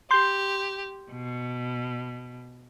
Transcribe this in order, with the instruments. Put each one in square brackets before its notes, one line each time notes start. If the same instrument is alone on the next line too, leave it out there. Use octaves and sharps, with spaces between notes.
[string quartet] G4 [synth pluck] C6 G6
[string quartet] B2